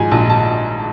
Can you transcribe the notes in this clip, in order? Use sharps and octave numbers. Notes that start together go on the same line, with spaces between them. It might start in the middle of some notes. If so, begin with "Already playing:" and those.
Already playing: G#2 F3 G#5
A#1 A5
A5